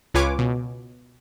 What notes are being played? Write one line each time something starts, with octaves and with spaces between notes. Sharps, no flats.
C#2 F4 B4 C#5 G#5 D6
B2